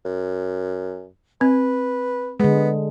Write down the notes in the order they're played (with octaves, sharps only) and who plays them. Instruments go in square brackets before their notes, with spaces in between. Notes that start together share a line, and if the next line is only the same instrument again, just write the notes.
[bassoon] F#2
[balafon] C4 [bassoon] B4
[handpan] D3 G#3 [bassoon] B3